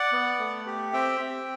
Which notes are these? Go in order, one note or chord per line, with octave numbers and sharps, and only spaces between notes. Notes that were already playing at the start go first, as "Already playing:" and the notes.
Already playing: D5 F#5
B3
A3
G4
C4 E5 G5
C4